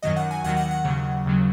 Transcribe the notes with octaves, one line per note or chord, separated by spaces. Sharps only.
F#2 D#3 F#3 D#5
F#5
G#5
D#2 D#3 F#3 F#5
F#5
F#5
D#2 C#3 F#3
D#2 C#3 F#3